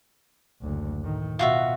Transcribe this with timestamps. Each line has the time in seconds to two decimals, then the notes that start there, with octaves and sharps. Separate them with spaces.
0.62 F#1 D2
1.02 A2 D#3
1.39 B2 F4 F#4 E5